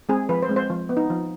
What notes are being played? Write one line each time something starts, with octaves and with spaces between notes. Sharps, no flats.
G#3 C4 G#4
F3 B4
C5
G#3 C4
C5
F3
B3
D#4
F3